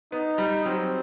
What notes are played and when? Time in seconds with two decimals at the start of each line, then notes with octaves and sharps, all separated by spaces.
0.12 B3 D#4
0.38 G3
0.65 F#3 C4